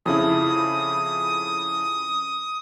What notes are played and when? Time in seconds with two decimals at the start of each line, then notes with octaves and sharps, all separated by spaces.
0.06 F2 C#3 E4 D#6